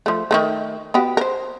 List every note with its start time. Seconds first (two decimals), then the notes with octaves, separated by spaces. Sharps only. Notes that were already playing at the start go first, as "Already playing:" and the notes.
0.06 F3 A3
0.31 D#3 F#3 A3
0.94 B3 F#4 G4
1.17 A#4 C5